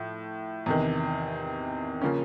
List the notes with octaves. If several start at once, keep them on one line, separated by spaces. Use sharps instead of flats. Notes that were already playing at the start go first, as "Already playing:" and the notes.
Already playing: A2 F3
E2 C3 D#3
C#3 F3 A#3 C#4